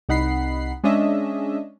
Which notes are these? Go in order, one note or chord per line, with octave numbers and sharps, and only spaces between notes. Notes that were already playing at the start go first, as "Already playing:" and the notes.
C2 D#4 F#5 B5 C7
G#3 C#4 D4 D#5 E5